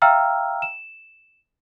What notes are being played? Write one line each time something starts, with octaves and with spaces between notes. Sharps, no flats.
E5 F5 G5 A#5 E6 F6
E7